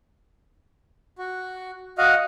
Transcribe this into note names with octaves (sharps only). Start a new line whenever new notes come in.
F#4
F#4 D#5 F5 F#5